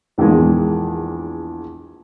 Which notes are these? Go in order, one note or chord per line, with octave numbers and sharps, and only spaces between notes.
A#1 E2 D#3 G#3